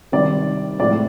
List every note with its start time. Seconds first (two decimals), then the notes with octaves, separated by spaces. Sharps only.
0.12 C3 D#3 G3 C4 D5
0.79 A2 F3 G#3 C4 D5